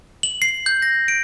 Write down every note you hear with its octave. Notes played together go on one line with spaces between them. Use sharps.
F#7
C7
G6
A#6
D7